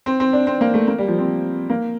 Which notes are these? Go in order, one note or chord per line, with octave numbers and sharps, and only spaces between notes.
C4
C4
D4
C4
A#3
A3
A#3
G3
F3
C4
A#3